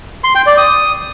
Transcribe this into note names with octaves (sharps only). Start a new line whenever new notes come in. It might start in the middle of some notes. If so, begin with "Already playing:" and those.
C6
G5
D5
D#6